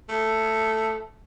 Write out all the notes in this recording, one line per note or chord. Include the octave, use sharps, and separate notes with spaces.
A3